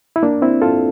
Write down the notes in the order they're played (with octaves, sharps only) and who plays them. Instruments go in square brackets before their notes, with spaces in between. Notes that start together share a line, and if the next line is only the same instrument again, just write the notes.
[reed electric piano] E4
A#3 D4
C4 E4
F4 A4